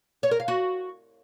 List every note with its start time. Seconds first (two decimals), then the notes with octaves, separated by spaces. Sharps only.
0.23 C#5
0.31 A#4
0.40 F5
0.48 F#4